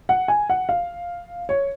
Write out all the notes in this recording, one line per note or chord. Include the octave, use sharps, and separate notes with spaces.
F#5
G#5
F#5
F5
C#5